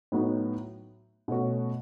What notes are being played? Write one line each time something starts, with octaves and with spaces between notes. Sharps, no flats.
A2 F#3 B3 D#4 F#4
B2 A3 C#4 F#4